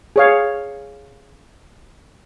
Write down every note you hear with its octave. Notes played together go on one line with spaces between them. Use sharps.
G#4 C#5 F5